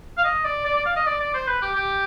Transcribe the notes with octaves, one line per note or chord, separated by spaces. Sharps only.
F5
D#5
D5
D5
D5
F5
D#5
D5
D5
C5
B4
G4
G4